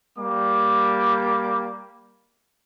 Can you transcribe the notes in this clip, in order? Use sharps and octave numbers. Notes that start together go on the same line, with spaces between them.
G3 A#3 D6